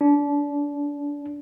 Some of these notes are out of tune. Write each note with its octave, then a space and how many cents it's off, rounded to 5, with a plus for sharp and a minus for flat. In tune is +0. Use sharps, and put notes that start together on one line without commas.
D4 -30